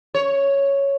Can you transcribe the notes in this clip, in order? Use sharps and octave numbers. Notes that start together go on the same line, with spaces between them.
C#5